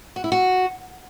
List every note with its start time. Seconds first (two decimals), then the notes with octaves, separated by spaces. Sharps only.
0.16 F#4
0.24 E4
0.32 F#4